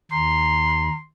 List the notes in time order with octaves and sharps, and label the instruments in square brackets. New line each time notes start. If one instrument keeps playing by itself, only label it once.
[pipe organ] D#2 [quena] A#5 [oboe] C6